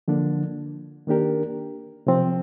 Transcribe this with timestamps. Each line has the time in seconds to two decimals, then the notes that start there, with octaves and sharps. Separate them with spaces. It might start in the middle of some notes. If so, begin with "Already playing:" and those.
0.08 D3 F3 A#3 D4
1.07 D#3 A#3 D4 G4 A#4
2.07 C3 F3 C4